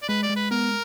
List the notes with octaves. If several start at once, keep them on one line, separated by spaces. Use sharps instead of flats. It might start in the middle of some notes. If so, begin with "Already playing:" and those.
D5
G#3 B4
D5
G#3
B4
B3 A#4